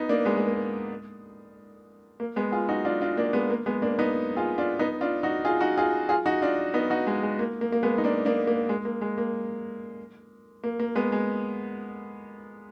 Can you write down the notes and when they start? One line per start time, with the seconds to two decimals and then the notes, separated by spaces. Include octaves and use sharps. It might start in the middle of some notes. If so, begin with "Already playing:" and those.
Already playing: B3 D#4
0.09 A#3 D4
0.25 G#3 B3
0.37 G#3
0.47 A#3
2.20 A#3
2.36 G#3 B3
2.52 F4 G#4
2.69 D#4 F#4
2.85 D4 F4
3.01 D4 F4
3.17 A#3 D4
3.33 G#3 B3
3.50 A#3
3.66 G#3 B3
3.82 A#3 D4
3.99 B3 D#4
4.36 F4 G#4
4.58 D4 F4
4.79 B3 D#4
5.01 D4 F4
5.23 D#4 F#4
5.45 F4 G#4
5.61 D#4 F#4
5.77 F4 G#4
6.09 F4 G#4
6.26 D#4 F#4
6.42 D4 F4
6.74 B3 D#4
6.90 D#4 F#4
7.07 G#3
7.23 G#3
7.39 A#3
7.61 A#3
7.72 A#3
7.83 G#3 B3
7.98 D#4
8.04 A#3 D4
8.25 A#3 D4
8.47 A#3
8.69 G#3
8.85 A#3
9.01 G#3
9.18 A#3
10.64 A#3
10.80 A#3
10.95 G#3 B3
11.12 G#3